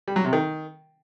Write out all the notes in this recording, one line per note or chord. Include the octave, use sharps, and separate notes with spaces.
G3
F#3
C3
D#3